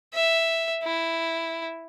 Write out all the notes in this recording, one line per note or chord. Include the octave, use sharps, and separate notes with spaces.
E5
E4